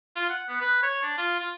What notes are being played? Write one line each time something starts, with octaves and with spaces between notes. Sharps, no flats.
F4
F#5
B3
B4
C#5
D4
F4
F4